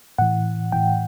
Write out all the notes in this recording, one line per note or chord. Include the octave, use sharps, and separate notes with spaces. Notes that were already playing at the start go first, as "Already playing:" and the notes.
A2 E3 F#5
A2 E3 G5